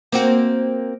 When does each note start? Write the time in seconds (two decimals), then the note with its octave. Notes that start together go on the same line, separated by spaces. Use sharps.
0.12 A#3 C4 F#4